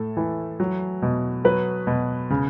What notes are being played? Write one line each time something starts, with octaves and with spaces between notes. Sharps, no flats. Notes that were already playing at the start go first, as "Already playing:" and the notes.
Already playing: A2 A4
E3
F#3
B2
F#3 B4
B2
C#3